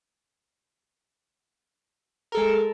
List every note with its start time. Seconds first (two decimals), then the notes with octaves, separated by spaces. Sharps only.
2.32 A#4
2.35 A4
2.37 G#3